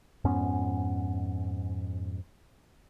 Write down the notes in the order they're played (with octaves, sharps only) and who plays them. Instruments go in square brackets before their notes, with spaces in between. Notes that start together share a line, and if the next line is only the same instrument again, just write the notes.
[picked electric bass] F2 G#2 B3 C#4